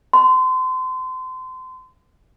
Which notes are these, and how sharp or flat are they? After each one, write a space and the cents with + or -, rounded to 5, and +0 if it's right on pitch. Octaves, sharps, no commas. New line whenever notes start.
C6 -30